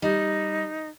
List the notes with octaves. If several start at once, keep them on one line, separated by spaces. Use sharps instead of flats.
G3 D#4